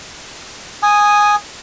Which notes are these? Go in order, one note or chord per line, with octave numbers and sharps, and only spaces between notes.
G#5 D#6